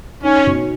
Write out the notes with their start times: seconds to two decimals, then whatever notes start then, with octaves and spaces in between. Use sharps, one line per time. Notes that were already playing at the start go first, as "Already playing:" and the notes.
0.23 C#4 D#4
0.46 B2